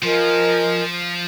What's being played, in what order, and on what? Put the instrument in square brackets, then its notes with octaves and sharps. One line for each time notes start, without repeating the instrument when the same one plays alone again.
[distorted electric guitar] F3 [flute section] F4 A#4 D#5 G#5